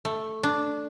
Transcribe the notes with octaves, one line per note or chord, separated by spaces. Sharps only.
A3
D4